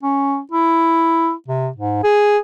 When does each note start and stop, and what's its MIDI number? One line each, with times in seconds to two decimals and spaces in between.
0.03 0.39 61
0.52 1.33 64
1.48 1.69 48
1.76 2.02 44
2.04 2.38 68